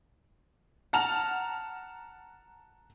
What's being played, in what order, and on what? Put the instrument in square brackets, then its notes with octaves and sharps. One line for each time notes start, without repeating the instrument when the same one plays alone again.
[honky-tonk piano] F#5 A5 A#5 F6 F7